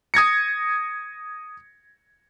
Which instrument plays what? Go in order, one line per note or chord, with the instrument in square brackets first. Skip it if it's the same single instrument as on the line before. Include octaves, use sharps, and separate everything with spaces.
[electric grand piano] D#6 G#6 A#6 C#7